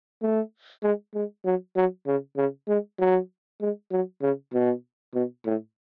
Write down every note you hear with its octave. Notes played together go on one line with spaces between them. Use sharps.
A3
G#3
G#3
F#3
F#3
C#3
C#3
G#3
F#3
G#3
F#3
C#3
B2
B2
A2